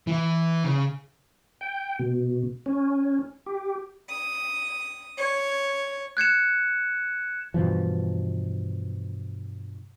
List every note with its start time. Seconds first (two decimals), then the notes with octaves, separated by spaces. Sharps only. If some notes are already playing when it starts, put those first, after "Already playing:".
0.07 E3 E4
0.64 C#3
1.61 G5
1.99 B2
2.66 C#4
3.46 G4
4.11 D#6
5.19 C#5
6.17 F#6 G#6 C#7 E7
7.54 G2 B2 E3 F3